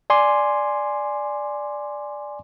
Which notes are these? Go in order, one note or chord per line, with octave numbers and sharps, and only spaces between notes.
D5 G#5 C6 D6